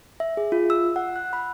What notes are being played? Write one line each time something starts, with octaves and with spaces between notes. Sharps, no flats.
E5
G#4
F4
E6
F#5
F#6
B5